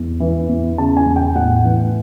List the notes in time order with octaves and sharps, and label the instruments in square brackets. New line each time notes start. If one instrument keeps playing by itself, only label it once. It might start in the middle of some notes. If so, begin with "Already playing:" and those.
Already playing: [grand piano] E2
E3
E2
C#3 A5
G#5
E2
G5
A2 F#5
E3